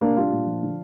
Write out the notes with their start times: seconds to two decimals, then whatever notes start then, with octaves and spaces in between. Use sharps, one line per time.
0.01 C3 A#3 D4
0.16 G3 D4 F4
0.32 A#2
0.47 F3
0.63 D3